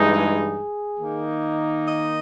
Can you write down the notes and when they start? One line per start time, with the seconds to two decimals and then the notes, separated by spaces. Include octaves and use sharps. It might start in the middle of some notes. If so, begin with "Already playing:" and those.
Already playing: G2 E3 G#3 D#4 G#4
0.99 D#3 A#3 D#4
1.88 D#5